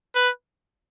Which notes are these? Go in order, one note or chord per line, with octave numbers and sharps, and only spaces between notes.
B4